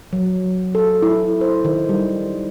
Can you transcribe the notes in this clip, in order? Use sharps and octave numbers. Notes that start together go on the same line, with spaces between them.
F#3
A4
E4
C5
D#3
G3